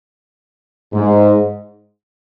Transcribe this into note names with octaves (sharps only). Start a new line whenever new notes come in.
G#2